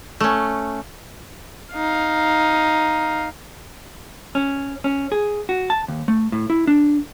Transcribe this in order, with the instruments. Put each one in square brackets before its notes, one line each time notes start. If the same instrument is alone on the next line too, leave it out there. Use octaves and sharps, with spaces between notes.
[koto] A3 C#4
[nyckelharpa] D#4 F5
[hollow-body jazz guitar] C#4
C#4
G#4
F#4
A5
D#2
A3
A2
E4
D4